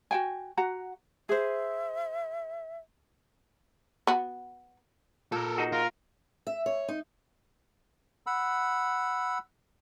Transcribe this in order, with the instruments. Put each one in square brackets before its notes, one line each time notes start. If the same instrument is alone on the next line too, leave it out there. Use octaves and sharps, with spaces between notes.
[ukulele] F#4 G5 G#5
F#4 F#5 A#5
[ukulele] G#4 C5 [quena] E5
[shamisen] B3 F#4
[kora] A#2 [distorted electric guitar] A4 A#4
[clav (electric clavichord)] D#4 F#4 G#4
[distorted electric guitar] F4 [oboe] A#4
[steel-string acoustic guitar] E5
C#5
D#4
[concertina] F#5 B5 E6